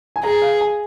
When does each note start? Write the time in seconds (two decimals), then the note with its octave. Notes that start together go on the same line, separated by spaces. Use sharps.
0.16 G#5
0.23 G#4 A#5
0.42 F5
0.61 G#5